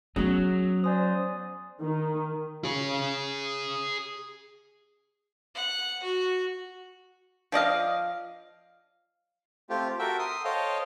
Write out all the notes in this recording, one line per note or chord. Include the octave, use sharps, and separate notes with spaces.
F#3 B3 C#4 G#4
C5 D5 G#5 D#6
D#3
G#4 C#5
F#5
F#4
F3 D5 D#5 F5
A3 C4 F4 G4
F#4 A4 A#4 E5 G5
C6 D#6
A4 C5 C#5 D#5 F5 G5